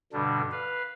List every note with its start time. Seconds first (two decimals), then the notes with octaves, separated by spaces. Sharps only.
0.13 G2 B2 D3 G3 D4
0.52 B4 F5